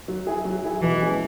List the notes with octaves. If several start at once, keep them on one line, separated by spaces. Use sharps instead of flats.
F#3
E4 G#4
F#3
E4 G#4
B2 E3
G#3 C#4 G#4